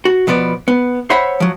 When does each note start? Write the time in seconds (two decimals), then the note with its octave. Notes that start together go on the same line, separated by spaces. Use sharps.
0.05 F#4
0.27 B2 F3 B3 B4 D5
0.68 B3
1.10 C5 C#5 E5 F#5 B5
1.40 F3 F#3